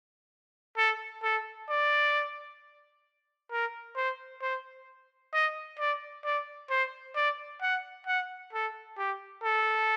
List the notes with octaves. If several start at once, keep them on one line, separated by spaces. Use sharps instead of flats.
A4
A4
D5
A#4
C5
C5
D#5
D5
D5
C5
D5
F#5
F#5
A4
G4
A4